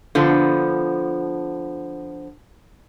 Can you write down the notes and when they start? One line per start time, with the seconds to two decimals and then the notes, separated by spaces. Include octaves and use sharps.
0.15 D3 F3 B3